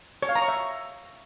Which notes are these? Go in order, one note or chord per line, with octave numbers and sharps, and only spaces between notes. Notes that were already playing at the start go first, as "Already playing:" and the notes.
C#5
F5
A#5
C#6
E5